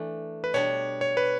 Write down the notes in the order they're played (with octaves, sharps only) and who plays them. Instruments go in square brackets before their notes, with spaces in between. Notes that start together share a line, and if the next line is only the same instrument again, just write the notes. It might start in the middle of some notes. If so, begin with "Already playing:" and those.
Already playing: [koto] E3 A3 D4
[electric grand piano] B4
[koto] B2 G3 D4 [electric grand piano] C#5
[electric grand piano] C#5
B4